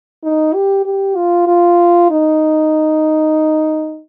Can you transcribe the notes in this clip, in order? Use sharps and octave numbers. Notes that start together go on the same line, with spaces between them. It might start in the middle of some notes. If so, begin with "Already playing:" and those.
D#4
G4
G4
F4
F4
D#4